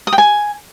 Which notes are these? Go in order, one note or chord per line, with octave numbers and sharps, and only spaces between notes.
D#6
G5
G#5